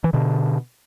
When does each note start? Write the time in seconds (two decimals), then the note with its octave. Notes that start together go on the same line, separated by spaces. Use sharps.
0.04 E3
0.13 B2 D3